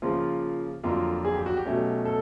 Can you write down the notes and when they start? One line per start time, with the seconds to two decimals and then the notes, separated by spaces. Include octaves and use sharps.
0.02 C#3 F3 A#3 F4
0.83 F2 D3 F#3 A#3 F4
1.25 G#4
1.35 G4
1.46 F#4
1.57 G4
1.65 B2 F#3 A3 C#4
2.05 A4